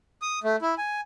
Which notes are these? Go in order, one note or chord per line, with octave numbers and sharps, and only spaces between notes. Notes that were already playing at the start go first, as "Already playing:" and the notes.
D#6
A3
E4
G#5